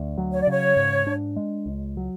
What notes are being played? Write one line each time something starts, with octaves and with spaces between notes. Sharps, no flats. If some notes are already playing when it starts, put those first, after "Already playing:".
Already playing: D2
F#3
C#5
D5
C#3 C#5
G#2
D4
G#3
C#2
F#3